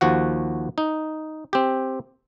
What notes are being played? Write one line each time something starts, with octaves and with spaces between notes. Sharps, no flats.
D#2 F3 F#4 F#5
D#4
C4 G4